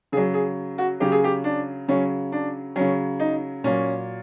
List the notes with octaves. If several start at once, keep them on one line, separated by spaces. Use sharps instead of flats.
C#3 F#3 G#4
G#4
F#4
C#3 F#3 G4
G#4
G4
D4
C#3 F#3 C#4
D4
C#3 F#3 C#4
D#4
A#2 F#3 C#4